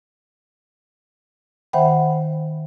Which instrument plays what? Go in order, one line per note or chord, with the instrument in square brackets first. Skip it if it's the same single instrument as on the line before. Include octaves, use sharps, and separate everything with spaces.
[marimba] D#3 C5 E5 F#5 G5 B5